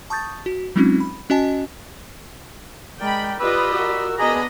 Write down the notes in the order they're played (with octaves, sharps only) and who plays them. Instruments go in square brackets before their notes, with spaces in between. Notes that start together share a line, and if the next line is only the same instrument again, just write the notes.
[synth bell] A5 C#6 D#6 G6 A6
F#4
F#3 G#3 C4 C#4 D#4 F4
B5
C#4 F#4 D#5 G#5 A5
[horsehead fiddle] G#3 [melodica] A#4 D5 [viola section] G5 B5
[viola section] F4 G4 D#5 [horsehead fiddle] B4 [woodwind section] D5 B5 [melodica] E6
[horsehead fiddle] F#4 A#4
[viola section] B3 D#5 B5 [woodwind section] D4 A#5 [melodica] G#4